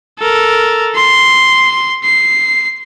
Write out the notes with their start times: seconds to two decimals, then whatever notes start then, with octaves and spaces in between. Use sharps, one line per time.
0.19 A4 A#4
0.95 C6
2.04 C7